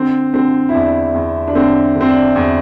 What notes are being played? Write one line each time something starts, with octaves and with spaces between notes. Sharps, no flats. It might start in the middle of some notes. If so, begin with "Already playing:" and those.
Already playing: D3 C4
D3 C4
E4
E2 D4
E2
D4
D3 C4
D3
C4
D4
E2